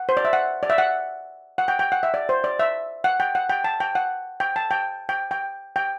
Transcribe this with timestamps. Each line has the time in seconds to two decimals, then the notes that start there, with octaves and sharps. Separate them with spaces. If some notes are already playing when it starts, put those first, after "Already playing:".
Already playing: F#5
0.09 C5
0.17 D5
0.25 E5
0.33 F#5
0.63 D5
0.70 E5
0.78 F#5
1.58 F#5
1.68 G5
1.79 G5
1.92 F#5
2.03 E5
2.14 D5
2.29 C5
2.44 D5
2.59 E5
3.04 F#5
3.20 G5
3.35 F#5
3.50 G5
3.64 A5
3.80 G5
3.95 F#5
4.40 G5
4.56 A5
4.71 G5
5.09 G5
5.31 G5
5.76 G5